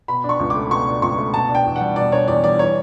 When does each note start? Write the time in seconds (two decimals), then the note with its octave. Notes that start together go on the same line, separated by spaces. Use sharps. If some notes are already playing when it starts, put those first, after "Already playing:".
0.08 B2 B5
0.24 D4
0.29 C#6
0.40 C#2
0.50 D6
0.55 A3
0.71 B2 C#6
0.87 D4
1.02 C#2 C#6
1.18 A3
1.34 B2 A5
1.49 D4
1.55 G5
1.65 E2
1.76 F#5
1.81 G3
1.96 B2 D5
2.12 D4 C#5
2.28 E2 D5
2.43 G3 D5
2.59 E3 C#5